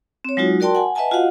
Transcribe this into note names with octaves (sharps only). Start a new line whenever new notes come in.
C4 C#5
F#3 G#3 D#4 F4 F#4
F#4 A#4 D5 G5 A5 C6
F#5 G#5
B4 D#5 E5 F#5 G#5 A5
F4 F#4 D#5 F5 F#5